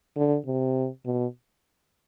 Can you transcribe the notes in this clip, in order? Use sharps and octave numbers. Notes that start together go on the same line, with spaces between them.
D3
C3
B2